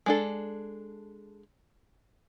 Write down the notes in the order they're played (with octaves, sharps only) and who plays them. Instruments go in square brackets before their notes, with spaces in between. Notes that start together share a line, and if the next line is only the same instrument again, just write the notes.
[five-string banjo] G#3 D4 A4